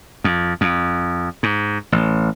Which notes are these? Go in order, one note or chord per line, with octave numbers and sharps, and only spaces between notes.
F2
F2
G#2
A1